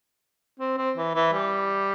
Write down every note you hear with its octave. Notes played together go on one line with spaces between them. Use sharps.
C4
C4
E3
E3
G3